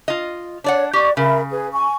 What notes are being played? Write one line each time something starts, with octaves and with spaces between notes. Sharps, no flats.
F4 D#5
D4 C#5 D5 F#5
G4 D5 C#6
C#3 A#4 E5 B5
G#4 B4
G#5 C#6